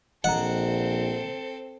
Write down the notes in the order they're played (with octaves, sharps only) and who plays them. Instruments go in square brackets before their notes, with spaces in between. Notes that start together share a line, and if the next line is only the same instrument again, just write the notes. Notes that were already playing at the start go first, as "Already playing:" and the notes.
[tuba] A#1 [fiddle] C4 A4 [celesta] D#5 A#5 [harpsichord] F#5